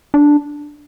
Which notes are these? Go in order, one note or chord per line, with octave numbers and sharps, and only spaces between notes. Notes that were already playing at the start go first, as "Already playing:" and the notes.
D4